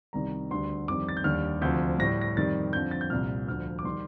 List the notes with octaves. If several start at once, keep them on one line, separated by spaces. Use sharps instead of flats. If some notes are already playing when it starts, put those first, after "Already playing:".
C2 C3 D#3 G3 A#5
D2 D3 G3 C6
F2 D#3 G3 D6
A6
G6
D#2 D3 G3 F6
D2 C3 F3 G6
A2 G3 A#6
A#6
F2 D#3 G3 A6
F2 D3 F3 G6
A6
G6
C2 A#2 G3 F6
D2 D3 F3 F6
D6
D#3 G3 C6